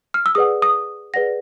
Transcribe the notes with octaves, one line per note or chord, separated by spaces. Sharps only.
F6
E6
G#4 B4 D5 F#5 D#6
D#6
G#4 B4 D5 F#5 A#6